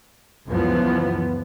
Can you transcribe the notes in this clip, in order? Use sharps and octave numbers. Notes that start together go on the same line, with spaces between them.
C#2 F#2 E3 F3 B3